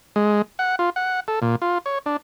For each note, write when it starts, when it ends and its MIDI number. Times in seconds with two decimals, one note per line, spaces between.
0.16 0.42 56
0.59 0.76 78
0.79 0.90 65
0.96 1.20 78
1.28 1.39 69
1.42 1.56 46
1.62 1.78 65
1.86 1.98 73
2.06 2.17 62